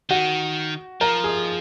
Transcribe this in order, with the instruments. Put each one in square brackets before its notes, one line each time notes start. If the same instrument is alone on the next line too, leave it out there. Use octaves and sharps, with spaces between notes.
[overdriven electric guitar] D#3 [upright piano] F#4
[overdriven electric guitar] F3 [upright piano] A#4
[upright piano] G#4